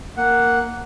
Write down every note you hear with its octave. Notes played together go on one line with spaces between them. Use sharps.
A#3 F#5